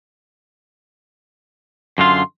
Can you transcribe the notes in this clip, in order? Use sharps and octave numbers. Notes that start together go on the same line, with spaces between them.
F#2 D3 F4 C6